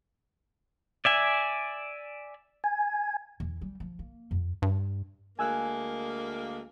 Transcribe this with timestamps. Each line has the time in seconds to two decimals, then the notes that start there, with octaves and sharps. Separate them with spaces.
1.05 D5 E5 G#5
2.64 G#5
3.40 E2
3.61 G3
3.80 F3
3.99 A#3
4.31 F2
4.62 G2
5.39 D2 G#3 A#3 G#5 E6 F#6